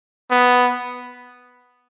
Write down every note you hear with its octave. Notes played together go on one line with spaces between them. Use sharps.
B3